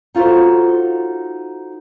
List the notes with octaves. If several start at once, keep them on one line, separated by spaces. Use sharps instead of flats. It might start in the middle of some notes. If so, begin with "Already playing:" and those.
D#4 F4 F#4 A4 C5